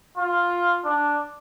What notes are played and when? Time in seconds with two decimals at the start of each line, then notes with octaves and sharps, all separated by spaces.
0.17 F4
0.84 D4